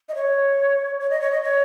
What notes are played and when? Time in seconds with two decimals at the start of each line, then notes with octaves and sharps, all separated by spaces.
0.09 D#5
0.15 C#5
1.00 C#5
1.10 D#5
1.21 C#5
1.32 D#5
1.42 C#5